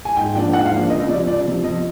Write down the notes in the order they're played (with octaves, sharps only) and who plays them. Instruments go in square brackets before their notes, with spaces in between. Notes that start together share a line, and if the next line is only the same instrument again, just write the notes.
[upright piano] G#5
G#2 G5
F3 A#3 D4 G5
G#2 F#5
F5
F3 A#3 D4
C#2 D#5
C3 F3 D5
C#2 D5
C3 F3
F2 D#5